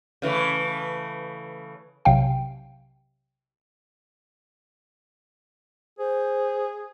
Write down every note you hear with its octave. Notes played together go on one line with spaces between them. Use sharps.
C#3 E3 A3
B1 C3 F#3 F5 G5
G#4 C5